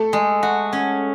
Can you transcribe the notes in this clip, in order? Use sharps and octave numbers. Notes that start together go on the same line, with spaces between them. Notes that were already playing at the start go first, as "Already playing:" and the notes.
Already playing: A3 A4
G#3
F#4
C#4